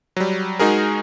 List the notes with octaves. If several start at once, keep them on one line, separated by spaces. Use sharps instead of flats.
F#3 G3
G#3 D#4 F#4 G#4 A#4